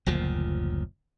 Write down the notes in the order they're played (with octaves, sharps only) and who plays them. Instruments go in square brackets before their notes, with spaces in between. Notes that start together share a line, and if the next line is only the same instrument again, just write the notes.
[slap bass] F#1 D2 A#2 F3